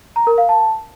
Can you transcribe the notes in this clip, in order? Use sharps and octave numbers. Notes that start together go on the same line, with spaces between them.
A#5
A#4
F5
A5